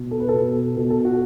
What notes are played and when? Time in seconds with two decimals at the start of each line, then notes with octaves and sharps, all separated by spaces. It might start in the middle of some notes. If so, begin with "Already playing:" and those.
Already playing: B2
0.11 A4
0.20 B4
0.28 B2 A4
0.76 B2 A4
0.90 A4
1.05 F#4